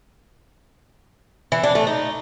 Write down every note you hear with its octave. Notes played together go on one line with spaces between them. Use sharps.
E3
D4
A3
D#4